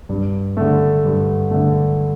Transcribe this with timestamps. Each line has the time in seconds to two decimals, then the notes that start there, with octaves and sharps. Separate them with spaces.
0.09 G2
0.57 D3 A3
1.05 G2
1.51 D3 A3